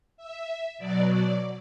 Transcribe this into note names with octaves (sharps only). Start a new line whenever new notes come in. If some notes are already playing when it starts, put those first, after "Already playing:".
E5
B2 F#3 D5
D5